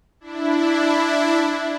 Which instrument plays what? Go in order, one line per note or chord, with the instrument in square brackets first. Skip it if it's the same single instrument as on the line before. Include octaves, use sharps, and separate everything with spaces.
[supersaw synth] D4 E4